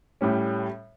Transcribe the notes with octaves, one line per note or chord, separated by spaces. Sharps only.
A2 G3 C#4